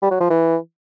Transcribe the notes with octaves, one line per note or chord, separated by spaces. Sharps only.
G3
F#3
F3
E3